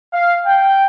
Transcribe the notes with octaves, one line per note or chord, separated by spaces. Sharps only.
F5
G5